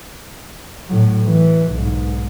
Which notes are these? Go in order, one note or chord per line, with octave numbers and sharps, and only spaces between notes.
A2 F#3
E3
B1 G#2